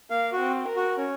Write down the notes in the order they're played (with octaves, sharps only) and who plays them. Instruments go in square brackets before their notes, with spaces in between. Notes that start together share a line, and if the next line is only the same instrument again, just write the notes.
[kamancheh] A#3 [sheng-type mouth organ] F5
[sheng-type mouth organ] F#4
[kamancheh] C4
A#4
[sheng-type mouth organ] F#4
C#4